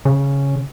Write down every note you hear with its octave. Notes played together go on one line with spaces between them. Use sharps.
C#3